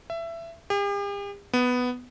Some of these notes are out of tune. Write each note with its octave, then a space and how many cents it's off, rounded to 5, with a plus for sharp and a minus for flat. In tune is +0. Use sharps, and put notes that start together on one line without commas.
E5 +20
G4 +45
B3 +5